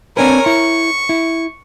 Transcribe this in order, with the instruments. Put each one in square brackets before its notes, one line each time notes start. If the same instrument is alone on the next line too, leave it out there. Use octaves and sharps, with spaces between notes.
[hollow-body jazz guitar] C4 D4 B4 [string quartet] A#4 C#5 G#5
[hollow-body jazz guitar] E4 [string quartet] C#6
[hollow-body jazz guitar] E4